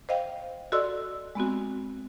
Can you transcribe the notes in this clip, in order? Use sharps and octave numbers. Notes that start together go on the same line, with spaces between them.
C5 D#5 F5 G5
F#4 A4 D5 D#5 C6 E6
G#3 B3 C4 F#4